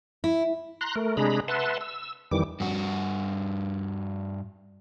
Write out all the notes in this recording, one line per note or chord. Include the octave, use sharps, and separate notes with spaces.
E4
A#5 C6 F#6
A3 A#4
C3 G#3 D4 G#4 A#5 B5
B4 E5 F#5 A5 C6
E6
F2 D#3 E3 G3 D6
G2 F#4